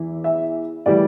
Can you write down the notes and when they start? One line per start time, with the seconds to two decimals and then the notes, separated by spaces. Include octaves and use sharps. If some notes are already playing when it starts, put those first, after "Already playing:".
Already playing: E2 E3 E4
0.24 E5
0.86 A2 E3 G3 D5